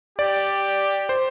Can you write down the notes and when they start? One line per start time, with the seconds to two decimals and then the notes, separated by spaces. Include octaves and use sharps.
0.19 G4 D5
1.09 C5